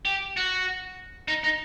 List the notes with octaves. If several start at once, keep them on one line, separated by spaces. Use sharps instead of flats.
G4
F#4
D#4
D#4